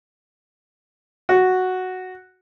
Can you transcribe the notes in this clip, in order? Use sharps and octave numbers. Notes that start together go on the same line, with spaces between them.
F#4